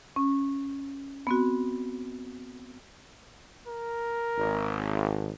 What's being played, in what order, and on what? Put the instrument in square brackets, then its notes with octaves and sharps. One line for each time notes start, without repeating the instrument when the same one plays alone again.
[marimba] C#4
B3 C4 F#4
[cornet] A#4
[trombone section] G#1